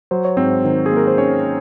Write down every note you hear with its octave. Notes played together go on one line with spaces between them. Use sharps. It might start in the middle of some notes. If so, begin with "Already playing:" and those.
F#3 C5
C#5
G#2 C4 C5
D#3
G#4
A#3
A#4
C5
D#3 C#4 C#5